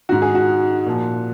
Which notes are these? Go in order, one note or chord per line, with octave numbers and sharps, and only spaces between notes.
G#2 D#3 F#4
G#4
F#4
A#2 F3